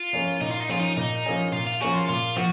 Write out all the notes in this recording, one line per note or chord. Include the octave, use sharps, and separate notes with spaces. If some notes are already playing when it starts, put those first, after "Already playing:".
Already playing: F4
F3 A#3 C#4 G#4
A#2 D#4
F4
D#4
F3 A#3 C#4 F4 G#4
D#4
A#2 D#4
F3 A#3 C#4 G#4
A#2 F4
F4
F3 A#3 C#4 F#4 G#4
F4
A#2 F4
F3 F#4